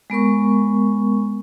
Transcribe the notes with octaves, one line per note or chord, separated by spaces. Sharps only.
G#3 B3 A#4 C#6